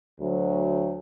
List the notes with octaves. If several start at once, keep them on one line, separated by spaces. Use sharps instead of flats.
D2 F#3